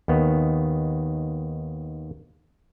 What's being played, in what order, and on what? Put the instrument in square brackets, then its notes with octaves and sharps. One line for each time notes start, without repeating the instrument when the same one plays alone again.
[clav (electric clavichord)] D#2 D#3 B3